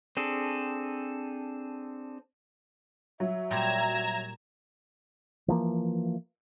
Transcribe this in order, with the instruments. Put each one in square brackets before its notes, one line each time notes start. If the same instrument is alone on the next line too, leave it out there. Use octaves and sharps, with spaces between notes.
[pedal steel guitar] C4 D4 G#4 A4
[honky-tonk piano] F#3 [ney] E5
[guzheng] A#2 G3 [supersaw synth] A#5 G#6 E7
[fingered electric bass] E3 F3 A#3